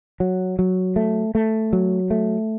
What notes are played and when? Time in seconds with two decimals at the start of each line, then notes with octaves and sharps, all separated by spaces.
0.20 F#3
0.59 F#3
0.96 A3
1.35 A3
1.73 F#3
2.11 A3